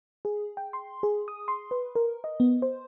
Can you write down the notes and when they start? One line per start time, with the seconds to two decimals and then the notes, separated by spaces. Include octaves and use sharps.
0.25 G#4
0.57 G5
0.73 C6
1.03 G#4
1.28 D#6
1.48 C6
1.71 B4
1.96 A#4
2.24 D#5
2.40 B3
2.62 C5